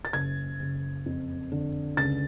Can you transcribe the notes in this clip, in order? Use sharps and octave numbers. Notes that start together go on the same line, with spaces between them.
A6
F#1 G#6
F#1
F2
D3
C#2 A6